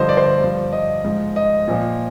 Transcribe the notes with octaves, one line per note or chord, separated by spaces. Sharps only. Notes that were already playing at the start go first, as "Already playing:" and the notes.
Already playing: G2 D3 F3 C5 D#5
D5
C5
D5
G2 F3
D#5
G#2 F3
D#5
A#2 F3